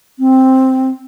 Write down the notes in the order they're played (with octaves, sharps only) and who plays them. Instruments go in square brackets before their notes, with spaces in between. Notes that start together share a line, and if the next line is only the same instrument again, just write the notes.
[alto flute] C4